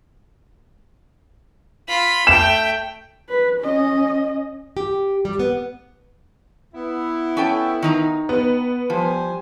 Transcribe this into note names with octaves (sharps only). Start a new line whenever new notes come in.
F4 B5
A3 G5 E7
B4
C#4 D#5
G4
G3
B3
B3 E4
C#4 A4 G5
D#3 D#4 A#5
B3
F3 G3 C5 G#5